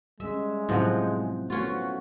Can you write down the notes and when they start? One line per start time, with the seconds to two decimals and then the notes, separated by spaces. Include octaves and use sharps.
0.20 G3 G#3 C#4 E5
0.69 A2 C3 F3 F#3 C5 F#5
1.50 A3 B3 C#4 F4 F#4